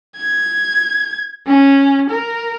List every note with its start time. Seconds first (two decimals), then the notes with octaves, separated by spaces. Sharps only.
0.17 G#6
1.47 C#4
2.10 A#4